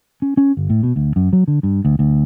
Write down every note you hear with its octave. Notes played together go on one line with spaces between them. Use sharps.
C#4
C#4
G1
A2
B2
D2
F#2
F#3
D3
G2
D2
D2